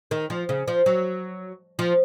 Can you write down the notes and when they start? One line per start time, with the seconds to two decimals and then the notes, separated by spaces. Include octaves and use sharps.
0.11 D#3
0.30 F3
0.49 C#3
0.68 F3
0.86 F#3
1.79 F3